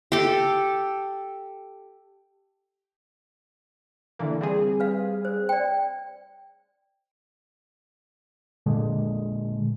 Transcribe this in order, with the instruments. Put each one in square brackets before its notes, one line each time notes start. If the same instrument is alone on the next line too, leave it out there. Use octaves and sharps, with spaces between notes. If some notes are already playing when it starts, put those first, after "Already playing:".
[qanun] G4 A4
[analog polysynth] D3 E3 A#3
G3 C4 G#4
[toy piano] B4 F5
C5
D5 G5
[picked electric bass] A#2 D3 G#3